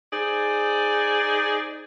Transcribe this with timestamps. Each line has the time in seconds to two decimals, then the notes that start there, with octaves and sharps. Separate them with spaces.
0.12 D#4 G#4 C5 D5